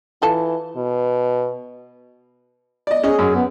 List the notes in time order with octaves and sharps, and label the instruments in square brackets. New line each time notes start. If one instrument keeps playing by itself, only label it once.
[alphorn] E3 [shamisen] F4 A4 A5
[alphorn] B2
[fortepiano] D5 D#5
[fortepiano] C#4 D#5 [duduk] G#4
[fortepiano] F#2
[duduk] B3